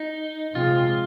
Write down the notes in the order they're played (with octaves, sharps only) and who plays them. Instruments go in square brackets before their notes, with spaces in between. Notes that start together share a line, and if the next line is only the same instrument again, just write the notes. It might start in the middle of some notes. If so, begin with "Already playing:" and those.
Already playing: [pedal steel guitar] D#4
[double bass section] C3 F3 G#3 C4 [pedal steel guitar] F4